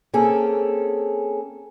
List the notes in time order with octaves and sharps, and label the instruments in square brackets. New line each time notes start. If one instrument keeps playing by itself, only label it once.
[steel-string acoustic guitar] A#3 C4 C#4 G#4 A4